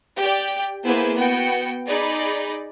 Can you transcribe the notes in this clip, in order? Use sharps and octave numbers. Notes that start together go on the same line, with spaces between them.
G4 D5 G5
A#3 B3 E4 G#4 B4 C5
B3 F#4 G5 C#7
D#4 G#4 D5 B5